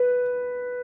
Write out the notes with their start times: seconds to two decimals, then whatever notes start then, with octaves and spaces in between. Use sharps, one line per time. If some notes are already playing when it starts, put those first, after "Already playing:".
Already playing: B4